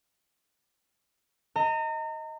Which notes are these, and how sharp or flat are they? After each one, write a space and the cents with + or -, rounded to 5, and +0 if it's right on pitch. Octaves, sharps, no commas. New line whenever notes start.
D#5 +15 A#5 -35